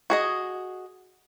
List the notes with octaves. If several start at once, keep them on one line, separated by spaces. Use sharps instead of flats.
F#4 G#4 D#5